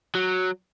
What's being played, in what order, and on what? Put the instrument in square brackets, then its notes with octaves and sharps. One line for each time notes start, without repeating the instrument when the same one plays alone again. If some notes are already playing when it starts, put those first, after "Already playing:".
[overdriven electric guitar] F#3